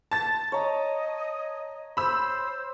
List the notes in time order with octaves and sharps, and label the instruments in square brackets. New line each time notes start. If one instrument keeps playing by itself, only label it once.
[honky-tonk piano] A5 A6
[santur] C#5 A#5 [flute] D#5
[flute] C5 [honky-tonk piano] B5 E6